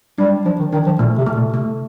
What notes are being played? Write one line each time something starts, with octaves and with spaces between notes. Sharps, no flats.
G3 D4
F3 D4
D#3
D#3 D4
F3
A#2 A3
C3
A3
A#2
C3 A3